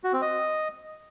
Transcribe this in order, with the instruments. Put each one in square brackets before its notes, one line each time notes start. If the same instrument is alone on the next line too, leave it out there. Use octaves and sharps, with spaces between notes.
[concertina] F#4
C4
D#5